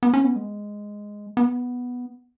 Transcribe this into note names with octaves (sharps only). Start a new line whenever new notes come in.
B3
C#4
B3
G#3
B3